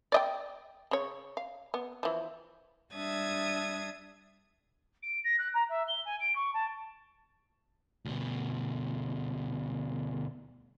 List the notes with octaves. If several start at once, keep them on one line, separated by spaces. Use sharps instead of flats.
D5 D#5 G5
C#3 C#5
F5
B3
E3 F3
G3 D4 E5 D#6 G#6
D7
A#6
F#6
A#5
E5
G7
G#5
D7
C#6
A5
D2 B2